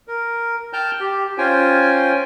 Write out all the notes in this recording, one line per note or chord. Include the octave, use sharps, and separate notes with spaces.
A#4
G5 A5 F6 G6
G4
C#4 F4 C5 G5 G#5